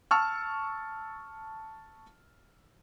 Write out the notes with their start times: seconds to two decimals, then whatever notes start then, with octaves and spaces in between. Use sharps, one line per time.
0.11 A5 C#6 E6 F6